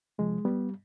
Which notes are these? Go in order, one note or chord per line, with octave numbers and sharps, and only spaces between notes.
C3 F3 G#3
G3 B3